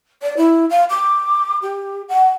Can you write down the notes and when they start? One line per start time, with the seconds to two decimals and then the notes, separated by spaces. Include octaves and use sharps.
0.22 D5
0.37 E4
0.70 F5
0.90 D6
1.62 G4
2.08 F#5